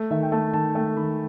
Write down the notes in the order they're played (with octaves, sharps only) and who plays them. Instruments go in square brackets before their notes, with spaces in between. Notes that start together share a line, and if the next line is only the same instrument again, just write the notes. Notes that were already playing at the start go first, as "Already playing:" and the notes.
Already playing: [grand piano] A3
D#3 E5
G5
A3 A5
D#3 A5
A3 G5
D#3 B5